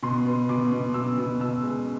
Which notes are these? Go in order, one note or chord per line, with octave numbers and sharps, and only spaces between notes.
B2 C6
B3
B2 D6
B2
B2 E6
B2
B2 E6
G#3